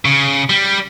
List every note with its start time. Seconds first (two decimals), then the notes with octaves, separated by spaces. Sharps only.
0.05 C#3
0.50 G3